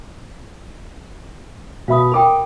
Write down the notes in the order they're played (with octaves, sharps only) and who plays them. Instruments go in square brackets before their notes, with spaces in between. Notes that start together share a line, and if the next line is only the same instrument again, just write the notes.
[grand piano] B2 E5 B5 [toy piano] F5 D#6
[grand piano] A#4 D6 D#6 [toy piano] G5 B5